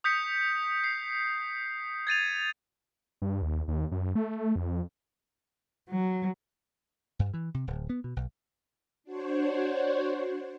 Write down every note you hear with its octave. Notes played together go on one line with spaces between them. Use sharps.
D#6 G6 B6 C#7
C7
G#6 A6 D#7 F7
G2
D#2
D#2
F#2
A3
F2
F#3
G2
E3
C3
D1
B3
B2
B1
D4 F#4 C5 C#5